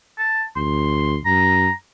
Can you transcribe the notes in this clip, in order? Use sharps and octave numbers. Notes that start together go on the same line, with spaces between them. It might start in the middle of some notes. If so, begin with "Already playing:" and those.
A5
D2 C6
F#2 A#5